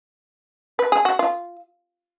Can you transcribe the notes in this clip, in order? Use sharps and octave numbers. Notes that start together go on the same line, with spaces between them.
B4
G#4
F#4
F4